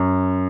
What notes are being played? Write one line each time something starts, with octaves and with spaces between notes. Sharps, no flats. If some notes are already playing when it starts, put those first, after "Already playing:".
Already playing: F#2